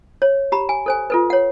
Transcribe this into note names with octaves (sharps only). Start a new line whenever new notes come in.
C#5
G4 A#5 B5
G#5
A4 C5 G#5
F4 A4 B4
C#5 F#5